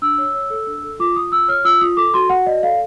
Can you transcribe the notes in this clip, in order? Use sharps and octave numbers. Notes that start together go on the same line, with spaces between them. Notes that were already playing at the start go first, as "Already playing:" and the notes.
D4 E6
C#5
C#5
A4
D4
A4
F4 D6
F4 D#6
F4 E6
C#5 F6
F4 E6
F4 D#6
A4 D6
F#4 C6
F#4 F#5
D5 D#5
A4 F5